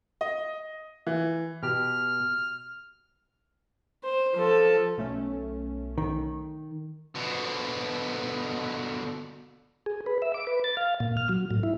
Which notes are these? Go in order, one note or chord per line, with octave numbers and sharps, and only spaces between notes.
D#5
E3
B2 G4 F6
C5
F3 A4
B1 A3 C#4
D#3
B2 D3
G#4
B4
E5
D6
B4
A6
F5
A#2
F6
F#3
A2
E4